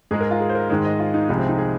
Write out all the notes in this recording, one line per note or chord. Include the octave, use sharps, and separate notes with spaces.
G#2 G#3 G#4
A#4
F4
G#4
C5
A#4
G#2 D#3 G#3 C5
D#5
F4
D#4
C2 C3 F3 G#3 D#4
C4
D#4
G#4